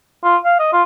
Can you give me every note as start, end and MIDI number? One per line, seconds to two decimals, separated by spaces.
0.23 0.36 65
0.45 0.55 77
0.59 0.71 75
0.73 0.83 65